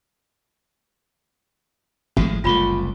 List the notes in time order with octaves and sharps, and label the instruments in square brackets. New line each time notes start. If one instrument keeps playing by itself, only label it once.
[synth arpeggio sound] G#1 [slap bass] A2 F3 G#3
[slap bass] F#1 C2 A3 [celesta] F4 B5 G7